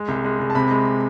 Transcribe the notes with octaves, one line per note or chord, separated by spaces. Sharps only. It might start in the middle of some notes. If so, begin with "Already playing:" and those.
Already playing: G#3
C2
G#3
C2
A5
C3 B5
G#3